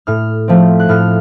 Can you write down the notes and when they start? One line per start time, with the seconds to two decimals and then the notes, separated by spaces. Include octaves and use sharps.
0.07 A2 F6
0.48 F3 A3 C4
0.80 F#6
0.89 A2 F6